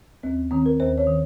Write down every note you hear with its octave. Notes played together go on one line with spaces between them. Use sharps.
D#2 C4
D#3 C4
A#4
D#2 C5
C#5
D#3